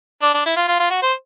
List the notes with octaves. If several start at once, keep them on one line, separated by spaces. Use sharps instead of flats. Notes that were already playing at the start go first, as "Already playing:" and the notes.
D4
D4
E4
F4
F4
F4
F#4
C5